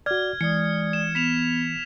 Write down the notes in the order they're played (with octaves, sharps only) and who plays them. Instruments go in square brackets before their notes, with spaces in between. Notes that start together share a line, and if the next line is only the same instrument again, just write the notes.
[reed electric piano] F#4 D5 [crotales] F6 G#6
[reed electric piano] E3 [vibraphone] G#3 D5 D#6 [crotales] C#7
[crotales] E7
[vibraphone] B3 [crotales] B6 E7 F7